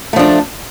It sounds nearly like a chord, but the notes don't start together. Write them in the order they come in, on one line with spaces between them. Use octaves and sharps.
A3 F3 D4